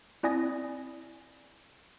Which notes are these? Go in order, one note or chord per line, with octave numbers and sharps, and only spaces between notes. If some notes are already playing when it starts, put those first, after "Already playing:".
C4 E4 D5 G#5 D#6 A#6